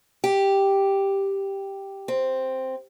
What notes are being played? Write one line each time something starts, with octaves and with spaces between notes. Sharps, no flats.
G4
C4